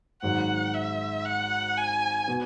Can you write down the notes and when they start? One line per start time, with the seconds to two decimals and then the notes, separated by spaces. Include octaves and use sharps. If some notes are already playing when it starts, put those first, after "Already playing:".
0.22 G#1 G#2 F#3 F#5
0.74 E5
1.25 F#5
1.77 G#5
2.28 B2 B3